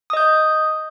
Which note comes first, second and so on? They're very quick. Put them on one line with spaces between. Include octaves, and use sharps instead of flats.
D#6 D#5 G6